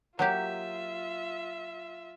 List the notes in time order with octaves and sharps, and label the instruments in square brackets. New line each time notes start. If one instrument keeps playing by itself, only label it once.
[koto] F#3 A#3 G4 [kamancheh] F4 E5